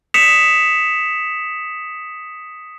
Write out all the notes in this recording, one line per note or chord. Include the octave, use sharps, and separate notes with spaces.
D#6 B6 C#7 E7 F7